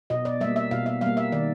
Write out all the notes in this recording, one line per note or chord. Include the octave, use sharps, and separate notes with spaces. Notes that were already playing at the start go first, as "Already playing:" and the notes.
B2 D#5
D5
G3 A#3 E5
E5
B2 F5
E5
G3 A#3 F5
E5
D#3 D5